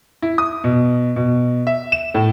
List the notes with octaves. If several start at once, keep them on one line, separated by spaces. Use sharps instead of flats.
E4
D#6
B2
B2
E5
E7
A2